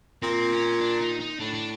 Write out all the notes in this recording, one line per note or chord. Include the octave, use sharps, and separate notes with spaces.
A#2 C4
C#4
D4
D#4
D#4
A2 D4
D4